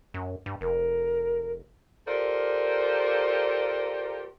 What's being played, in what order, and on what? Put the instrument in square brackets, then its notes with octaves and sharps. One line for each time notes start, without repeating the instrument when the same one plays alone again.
[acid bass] F#2
G2
[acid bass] F1 [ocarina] A#4
[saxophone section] F4 G4 A4 A#4 C5 D5